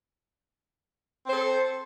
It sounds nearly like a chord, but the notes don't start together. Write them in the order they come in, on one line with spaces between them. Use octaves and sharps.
C4 C5 A4